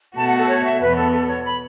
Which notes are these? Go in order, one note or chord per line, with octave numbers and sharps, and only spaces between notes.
B2 A3 F#4 A5
F#5
A4
C#5
E5
E2 B2 B3 B4
A4
A4
C#5
B5